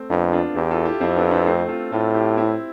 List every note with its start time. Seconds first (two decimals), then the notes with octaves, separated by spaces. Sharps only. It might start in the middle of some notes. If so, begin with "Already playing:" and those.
Already playing: A3 C4
0.10 F2 B3 D4
0.32 D4 F4
0.55 E2 E4 G4
0.71 F4 A4
0.85 E4 G4
1.01 F2 C4 E4
1.16 B3 D4
1.31 B3 D4
1.46 A3 C4
1.69 F4 A4
1.92 A2 F4 A4
2.14 E4 G4
2.37 C4 E4